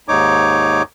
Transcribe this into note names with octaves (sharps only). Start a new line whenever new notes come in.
D#2 G#2 D#4 C#5 D6